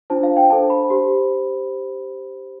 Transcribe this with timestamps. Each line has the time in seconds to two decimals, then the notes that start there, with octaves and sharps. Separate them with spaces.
0.10 D4 F4 C5 A5
0.23 F5
0.37 G5
0.50 D4 A4 C5 A5
0.70 B5
0.90 G4 C5